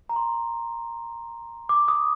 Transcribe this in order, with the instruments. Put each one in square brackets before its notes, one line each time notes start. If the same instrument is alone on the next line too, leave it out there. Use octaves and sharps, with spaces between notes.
[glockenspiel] A#5
C6
D6
D#6